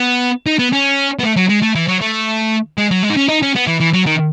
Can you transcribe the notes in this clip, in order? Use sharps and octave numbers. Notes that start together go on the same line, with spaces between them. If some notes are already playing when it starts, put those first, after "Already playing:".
Already playing: B3
D#4
B3
C#4
B3
A3
F#3
G#3
A3
E3
F#3
A3
G#3
F#3
G#3
D#4
C#4
D#4
C#4
B3
E3
E3
F#3
D#3